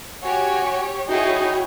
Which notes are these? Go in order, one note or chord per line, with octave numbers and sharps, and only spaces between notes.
F#4 G4 C#5 G#5
D#4 E4 F#4 G#4 C#5 G5